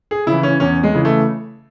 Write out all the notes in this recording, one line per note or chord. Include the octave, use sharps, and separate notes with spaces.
G#4
C#3 E4
E3
C#4
E2 C#4
G#3
C#3 E3
A3